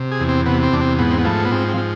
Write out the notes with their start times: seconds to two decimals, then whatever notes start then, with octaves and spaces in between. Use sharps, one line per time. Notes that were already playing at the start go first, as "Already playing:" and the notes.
Already playing: C3
0.11 G#4
0.20 E2
0.29 C4
0.46 C3 B3
0.63 C4
0.72 E2 D4
0.81 C4
0.99 G#2 B3
1.11 C4
1.18 B3
1.25 F3 A3
1.45 B3
1.51 G#2 C4
1.69 C4
1.77 F3